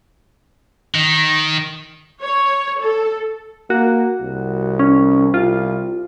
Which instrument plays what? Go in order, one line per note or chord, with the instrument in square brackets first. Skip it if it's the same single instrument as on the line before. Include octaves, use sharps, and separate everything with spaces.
[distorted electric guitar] D#3
[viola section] C#5
A4
[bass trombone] A#3 [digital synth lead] F#4
[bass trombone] C2
[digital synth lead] C#4
[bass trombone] C2 [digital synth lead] F4